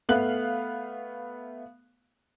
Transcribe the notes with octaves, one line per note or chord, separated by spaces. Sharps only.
A3 B3 F5 F#6 F#7